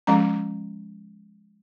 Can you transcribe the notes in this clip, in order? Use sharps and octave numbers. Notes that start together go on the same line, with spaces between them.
F3 G#3 C#4 A#5